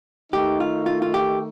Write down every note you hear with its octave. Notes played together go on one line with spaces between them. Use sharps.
D#3 A3 D#4 G4
F4
F4
F4
G4